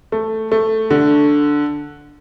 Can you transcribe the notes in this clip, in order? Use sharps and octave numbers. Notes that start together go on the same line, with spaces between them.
A3
A3
D3